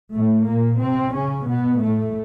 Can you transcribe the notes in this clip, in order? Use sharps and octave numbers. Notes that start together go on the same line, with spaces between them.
A2 A3
A#2 A#3
C3 C4
C#3 C#4
B2 B3
A2 A3